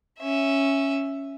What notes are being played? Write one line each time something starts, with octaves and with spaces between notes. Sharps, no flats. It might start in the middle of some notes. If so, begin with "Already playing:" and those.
C#4 E5